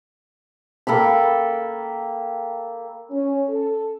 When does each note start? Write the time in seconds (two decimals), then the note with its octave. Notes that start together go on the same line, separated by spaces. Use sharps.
0.87 A#3 A4 G5 B5
3.10 C#4
3.49 A4